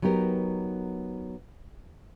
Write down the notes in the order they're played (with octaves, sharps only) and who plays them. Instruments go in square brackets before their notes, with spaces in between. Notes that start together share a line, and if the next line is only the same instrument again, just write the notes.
[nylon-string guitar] F#3 B3 D#4 G4 A#4